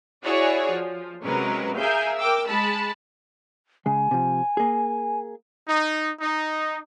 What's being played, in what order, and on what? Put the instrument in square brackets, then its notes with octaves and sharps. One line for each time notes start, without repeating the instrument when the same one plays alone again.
[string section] E4 F#4 G#4 C#5 D5
F3
C3 F#3 G#3 C#4 A#4 B4
G#4 A#4 E5 F5 G#5 G6
A#4 G5 D6 E6
G#3 A5 B5
[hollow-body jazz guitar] C#3 G#3 [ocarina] G#5
[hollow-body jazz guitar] C3 F3
A#3 G#4
[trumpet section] D#4
D#4